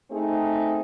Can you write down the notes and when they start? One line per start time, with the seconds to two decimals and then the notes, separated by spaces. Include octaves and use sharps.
0.11 A3 C4 D#4 G#4